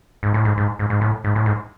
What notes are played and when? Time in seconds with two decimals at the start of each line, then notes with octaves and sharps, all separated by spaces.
0.23 G#2
0.34 A2
0.45 G#2
0.57 G#2
0.79 G#2
0.90 G#2
1.01 A2
1.24 G#2
1.36 A2
1.46 G#2